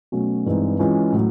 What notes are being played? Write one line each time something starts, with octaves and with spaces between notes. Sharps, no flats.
B2 F#3 A3 C#4 F#4
G2 E3 G#3 C4 D#4
E3 G#3 C#4 F4
A2 F#3